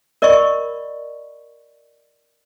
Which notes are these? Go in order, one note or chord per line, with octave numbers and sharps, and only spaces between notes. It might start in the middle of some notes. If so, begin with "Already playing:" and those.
A#4 D5 D#5 B5 C#6